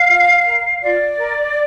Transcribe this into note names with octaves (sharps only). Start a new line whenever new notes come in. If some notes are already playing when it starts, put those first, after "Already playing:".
Already playing: F5
F4
A#4
F4 D5
A#4